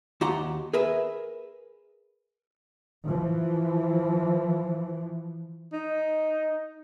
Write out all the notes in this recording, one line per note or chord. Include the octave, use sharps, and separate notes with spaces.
D#2 F#4 G4 F#5 A#5 C6
G#4 A#4 B4 E5
E3 F3
D#4